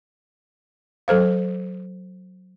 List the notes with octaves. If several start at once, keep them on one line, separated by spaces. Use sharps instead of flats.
F#3 A4 C5 F5